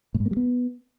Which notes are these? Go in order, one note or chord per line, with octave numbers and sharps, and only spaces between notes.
A2
G#2
A#3
G3
B3